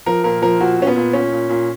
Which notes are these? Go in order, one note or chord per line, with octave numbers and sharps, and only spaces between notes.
F3 A#4
A#2 A#4
F3 A#4
A#2 F#4
A#2 C#4
B3
A#2
A#2 C#4
A#2
A#2